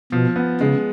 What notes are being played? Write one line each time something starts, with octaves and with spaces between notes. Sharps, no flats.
B2 F3
B3
C#3 G#3